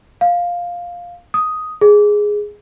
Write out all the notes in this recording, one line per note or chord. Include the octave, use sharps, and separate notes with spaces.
F5
D#6
G#4